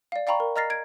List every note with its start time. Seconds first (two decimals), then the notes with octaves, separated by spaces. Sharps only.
0.12 D5 F5
0.27 D5 F5 G5 A#5 B5 C#6
0.40 A#4
0.56 D#5 A#5 F6 A6 A#6 C7
0.70 G#6 D7